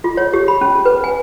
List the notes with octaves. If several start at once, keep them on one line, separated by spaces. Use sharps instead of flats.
F4
C#5
G4
B5
C#4
B4
G#5